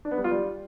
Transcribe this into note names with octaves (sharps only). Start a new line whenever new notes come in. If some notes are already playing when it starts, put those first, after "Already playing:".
D4
B3
G3
F4
G3